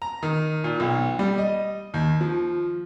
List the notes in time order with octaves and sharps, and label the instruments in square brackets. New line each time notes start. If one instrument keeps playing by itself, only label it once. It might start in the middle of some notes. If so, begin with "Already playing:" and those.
[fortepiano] A#5
D#3
A#2
B1
G3
D#5
D#2
F3